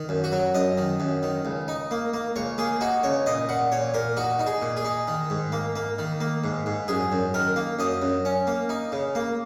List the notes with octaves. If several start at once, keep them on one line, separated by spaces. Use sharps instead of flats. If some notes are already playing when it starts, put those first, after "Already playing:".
Already playing: D#3
F#2
F#4
F#3
F#2 D#5
D#3
F#2
D#3
C#2
D#4
A#3
A#3
C#2 C#5
A#3 G#4
D#4 F#4
C#2 C#5
A#2 D#5
A#2 F#5
A#2 C#5
A#2 A#4
D#4 F#4
D#4
G#4
A#2
G#4
D#4
D#3
G#2
A#3
A#3
D#3
A#3
G#2
G#2
F#2 G#4
F#2
D#3 A#4
A#3
F#2 D#5
F#2
C#4
A#3
D#4
C#3
A#3